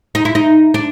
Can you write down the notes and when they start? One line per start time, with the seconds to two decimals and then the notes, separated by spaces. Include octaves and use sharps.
0.15 D#4
0.25 E4
0.35 D#4
0.74 D4